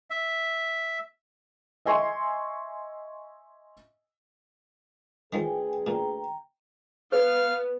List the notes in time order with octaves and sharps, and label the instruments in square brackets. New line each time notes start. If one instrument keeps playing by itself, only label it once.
[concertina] E5
[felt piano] D#5 E5 G#5 C6 C#6
[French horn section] D2 G#4 B4 [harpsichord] D#3 F3 [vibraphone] G5 G#5
[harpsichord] A#2 [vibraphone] G5 A#5
[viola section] B3 [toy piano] B4 [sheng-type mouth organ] F5 F6